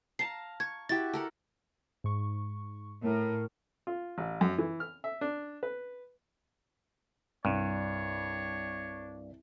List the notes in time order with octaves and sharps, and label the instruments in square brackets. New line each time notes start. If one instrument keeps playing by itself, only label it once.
[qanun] F5 A5 A#5 [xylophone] C7
[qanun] C#6 [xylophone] G#6
[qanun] E4 F#4 G4 [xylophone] A6
[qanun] A4 A#4 F#5
[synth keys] G#2 C#6
[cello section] A2 [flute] A#4
[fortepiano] F4
A1
F#2
E3
F6
E5
D4
B4
[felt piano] C2 [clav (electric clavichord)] G2 [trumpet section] D4 C#5